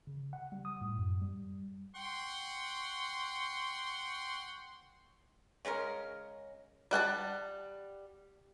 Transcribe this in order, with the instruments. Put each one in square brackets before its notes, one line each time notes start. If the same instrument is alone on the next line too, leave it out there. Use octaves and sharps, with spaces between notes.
[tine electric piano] C#3
F#5
G3
D#6
A2
F#2
G3
[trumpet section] F#5 G5 C6 C#6
[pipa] C#3 G#3 C#4 A#4
[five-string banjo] G3 F#5 G5 A5